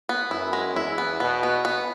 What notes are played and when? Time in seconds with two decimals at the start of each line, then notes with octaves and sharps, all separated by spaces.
0.09 B3
0.31 F#2 E4
0.53 G#3
0.76 E2 E4
0.98 B3
1.20 B2 B3
1.43 B3
1.65 B3